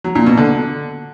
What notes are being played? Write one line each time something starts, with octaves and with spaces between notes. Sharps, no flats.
F#3
A#2
B2
D3